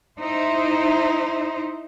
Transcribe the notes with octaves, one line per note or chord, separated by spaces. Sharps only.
D#4 E4 C5